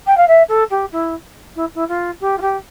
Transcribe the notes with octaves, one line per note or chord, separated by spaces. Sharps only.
G5
F5
E5
A4
G4
E4
E4
E4
F4
G4
F4
G4